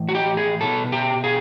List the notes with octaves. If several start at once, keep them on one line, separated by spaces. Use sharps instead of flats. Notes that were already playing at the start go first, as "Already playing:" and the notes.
Already playing: A2 E3
F#4
G4
G#4
B2 A4
G4
G#4